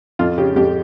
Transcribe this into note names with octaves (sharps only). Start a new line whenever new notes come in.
F2 F4
C#3 G4
F2 G4